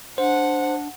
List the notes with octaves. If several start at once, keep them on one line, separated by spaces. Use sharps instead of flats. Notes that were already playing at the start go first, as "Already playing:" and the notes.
D4 C5 F#5